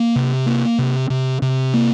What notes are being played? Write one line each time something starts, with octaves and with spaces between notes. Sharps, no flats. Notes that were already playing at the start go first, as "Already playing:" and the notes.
Already playing: A#3
C3
A#3
C3
C3
C3
A#3